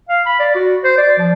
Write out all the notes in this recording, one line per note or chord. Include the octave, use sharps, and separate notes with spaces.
F5
B5
D5
F#4
C5
D5
F3